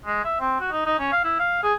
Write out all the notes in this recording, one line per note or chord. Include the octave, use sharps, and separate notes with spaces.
G#3
E5
C4
F#4
D#4
D#4
C#4
F5
E4
F5
G#4